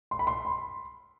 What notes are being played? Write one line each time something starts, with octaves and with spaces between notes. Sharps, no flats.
C6
B5
C6
B5